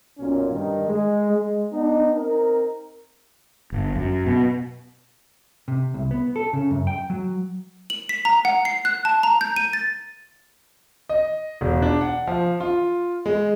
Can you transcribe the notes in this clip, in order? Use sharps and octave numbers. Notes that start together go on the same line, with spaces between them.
B1 F#2 A#2 C#4
G2 D#3
G#3
G#3
B3 D4 D#4
C4 D#4 A#4
G1
F#2
B2
C3
C2
B3
A4
C#3
F#2
G5
F#3
F#7
B6
A#5
F#5
C7
F#6
A5
A#5
G6
D#7
A6
D#5
E1
D4
F#5
F3
F4
G#3